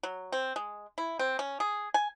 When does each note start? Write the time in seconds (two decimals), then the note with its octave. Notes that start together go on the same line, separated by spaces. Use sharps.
0.03 F#3
0.32 C4
0.56 G#3
0.98 E4
1.19 C4
1.39 C#4
1.60 G#4
1.94 G#5